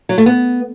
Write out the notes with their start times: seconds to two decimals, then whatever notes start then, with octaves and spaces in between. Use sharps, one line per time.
0.09 F#3
0.18 A3
0.26 B3